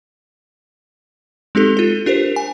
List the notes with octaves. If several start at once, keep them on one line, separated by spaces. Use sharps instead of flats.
G#3 C4 D#4 G4 A4
F4 A4
D4 G4 A#4 C5
G#5